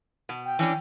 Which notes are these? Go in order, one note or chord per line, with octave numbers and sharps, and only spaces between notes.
B2
G5
E3 C#4 D4